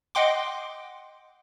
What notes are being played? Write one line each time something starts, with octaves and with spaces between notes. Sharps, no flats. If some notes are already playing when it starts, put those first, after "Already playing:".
D#5 F#5 G5 C6 D6